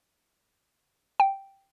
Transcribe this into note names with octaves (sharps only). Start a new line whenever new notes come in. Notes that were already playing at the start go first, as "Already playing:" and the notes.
G5